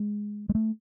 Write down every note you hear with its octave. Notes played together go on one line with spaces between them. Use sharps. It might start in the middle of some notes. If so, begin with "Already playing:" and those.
Already playing: G#3
G#3
A3